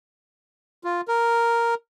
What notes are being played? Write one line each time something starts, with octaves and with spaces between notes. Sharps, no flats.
F4
A#4